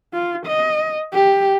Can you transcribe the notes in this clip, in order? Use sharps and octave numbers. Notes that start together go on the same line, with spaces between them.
F4
D#5
G4